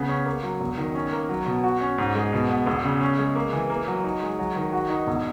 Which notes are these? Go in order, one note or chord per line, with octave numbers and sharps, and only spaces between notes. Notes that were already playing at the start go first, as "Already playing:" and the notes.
Already playing: C#3 B3
C#4
A#3
F#3
E1
D#3
C#4
A#3
F#3
B2
F#4
C#4
G#2
G#3
B2
B3
E1
C#3
C#4
G#3
A#3
E3
A#3
F#3
D#4
G#3
F#3
D#3
F#4
D#4
E1